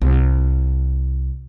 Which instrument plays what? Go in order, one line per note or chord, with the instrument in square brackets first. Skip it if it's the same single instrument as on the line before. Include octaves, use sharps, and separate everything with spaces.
[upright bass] C2